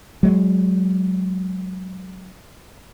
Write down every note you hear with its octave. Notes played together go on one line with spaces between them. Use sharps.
F#3 G#3